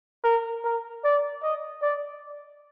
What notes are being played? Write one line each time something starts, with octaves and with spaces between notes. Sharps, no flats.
A#4
A#4
D5
D#5
D5